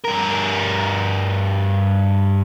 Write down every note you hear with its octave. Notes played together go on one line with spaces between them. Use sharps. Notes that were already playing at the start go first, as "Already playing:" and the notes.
G2 A#4